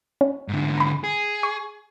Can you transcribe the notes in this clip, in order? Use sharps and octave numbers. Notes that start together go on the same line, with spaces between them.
C#4
G#2 D3
A#5 B5
G#4
C#6